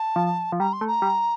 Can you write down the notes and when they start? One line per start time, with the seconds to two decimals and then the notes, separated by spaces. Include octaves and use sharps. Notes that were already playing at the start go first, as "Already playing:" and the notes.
Already playing: A5
0.16 F3
0.52 F3
0.60 G3 A#5
0.73 C6
0.81 A3
0.87 A#5
1.02 G3